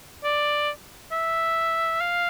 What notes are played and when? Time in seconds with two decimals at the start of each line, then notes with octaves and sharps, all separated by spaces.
0.24 D5
1.12 E5
2.01 F5